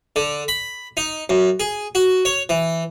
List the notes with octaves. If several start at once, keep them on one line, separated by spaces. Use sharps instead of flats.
D3
B5
D#4
F#2
G#4
F#4
C#5
E3